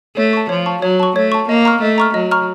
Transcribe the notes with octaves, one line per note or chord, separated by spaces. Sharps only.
A3 C#5
A5 C#6
F3 C#5
A5 C#6
F#3 C#5
A5 C#6
A3 C#5
A5 C#6
A#3 D#5
A#5 C#6 F6
A3 D#5
A#5 C#6 F6
F#3 D#5
A#5 C#6 F6